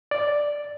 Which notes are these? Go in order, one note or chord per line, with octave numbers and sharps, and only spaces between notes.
D5